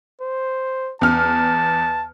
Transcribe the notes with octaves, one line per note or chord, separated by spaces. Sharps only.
C5
E2 A5 F6